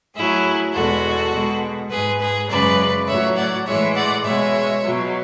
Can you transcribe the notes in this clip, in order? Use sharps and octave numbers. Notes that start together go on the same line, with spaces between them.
A2 F#3 E4 G#4
E2 B2 G#3 F#4 A4
B2 G#3
G#2 G#3 G#4 B4
G#4 B4
F#2 C#3 G#3 B4 D5
A2 F#3 C#5 E5
D5 F#5
A2 E3 G#3 C#5 E5
D5 F#5
B2 G#3 C#5 E5
B2 F#3